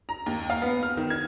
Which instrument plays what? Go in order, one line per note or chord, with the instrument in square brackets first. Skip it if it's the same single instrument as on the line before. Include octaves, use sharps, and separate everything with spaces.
[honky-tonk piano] A#5
D#2
F5
B3
F6
D#3
G#6